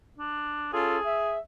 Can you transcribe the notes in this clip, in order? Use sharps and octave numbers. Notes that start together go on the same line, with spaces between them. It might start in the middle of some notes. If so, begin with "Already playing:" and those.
D4
C#4 F4 G#4 A4
E5